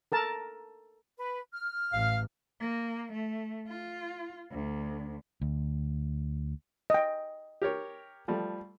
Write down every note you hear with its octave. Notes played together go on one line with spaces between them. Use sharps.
A4 A#4 A5
B4
F6
A1 F5
A#3
A3
F4
D2
D2
D#5 G5
G4 A#4 C#5
F3 G3 A3